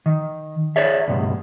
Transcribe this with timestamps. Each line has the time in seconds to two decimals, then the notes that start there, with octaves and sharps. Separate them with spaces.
0.06 D#3
0.76 G#4 C#5 D5 E5
1.08 C#2 G2 B2